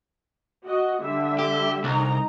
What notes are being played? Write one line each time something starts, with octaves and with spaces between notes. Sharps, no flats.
F#4 D#5
D3 G3 E5
G4
C2 D#4 A#5